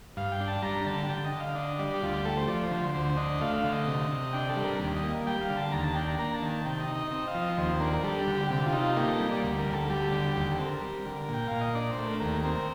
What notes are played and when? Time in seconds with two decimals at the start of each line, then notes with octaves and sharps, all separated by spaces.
0.17 G2 F5
0.32 G5
0.40 D4
0.48 A5
0.62 G3 A#5
0.86 D3 A5
1.09 D3 G5
1.25 D#5
1.32 D3
1.40 F5
1.55 D4 D#5
1.79 G3 D5
1.94 G4
2.02 D2 F4
2.14 G4
2.25 A3 A4
2.37 C5
2.48 F3 D5
2.64 C5
2.71 D3
2.79 C5
2.94 D2 C5
3.17 D4 D#5
3.41 A3 F5
3.56 F5
3.64 D3
3.72 D#5
3.87 C3
4.11 C3
4.33 D4 G5
4.50 A4
4.56 G3
4.64 A#4
4.79 D#2
4.96 D#5
5.03 A#3
5.27 G3 G5
5.41 F5
5.50 D3
5.57 A5
5.72 D#2 A#5
5.84 A5
5.95 D4 G5
6.08 A#5
6.18 A#3 A#5
6.34 A5
6.42 D#3
6.49 A5
6.65 C3 G5
6.80 D#5
6.88 D#4
6.95 D#5
7.11 C4 D#5
7.27 F5
7.34 F3
7.42 D#5
7.57 D#2 C5
7.80 D4 A#4
7.94 A#4
8.03 G3 A4
8.19 G4
8.27 D3
8.35 G4
8.50 C3 G4
8.66 F4
8.73 D#4
8.82 F4
8.96 A#3 G4
9.08 A4
9.20 G3
9.31 D5
9.43 D2
9.59 A#4
9.66 D2
9.74 A4
9.90 G3 G4
10.04 A4
10.12 D3 G4
10.36 D#2 G4
10.52 A4
10.59 C4
10.66 A#4
10.81 G3
11.05 D3
11.28 A#2
11.34 G5
11.48 A#2 F5
11.61 D#5
11.75 D4 D5
11.91 C5
11.98 A3
12.05 A#4
12.21 D#2 A#4
12.44 C4 A#4